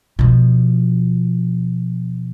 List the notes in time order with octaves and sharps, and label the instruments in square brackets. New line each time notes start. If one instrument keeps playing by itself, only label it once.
[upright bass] B2 F3